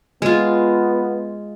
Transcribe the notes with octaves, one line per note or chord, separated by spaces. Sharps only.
G#3 B3 F4